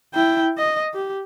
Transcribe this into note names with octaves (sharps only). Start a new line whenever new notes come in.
E4 G5
D#5
G4